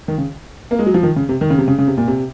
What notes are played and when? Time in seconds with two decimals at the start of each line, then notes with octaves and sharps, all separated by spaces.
0.08 D#3
0.18 C#3
0.71 A#3
0.79 G#3
0.86 F#3
0.94 F3
1.03 D#3
1.16 C#3
1.29 C3
1.41 D#3
1.50 C#3
1.58 C3
1.68 C#3
1.78 C#3
1.87 C3
1.97 A#2
2.08 C3